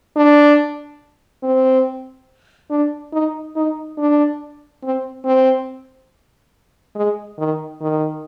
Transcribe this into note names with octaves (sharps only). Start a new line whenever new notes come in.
D4
C4
D4
D#4
D#4
D4
C4
C4
G#3
D#3
D#3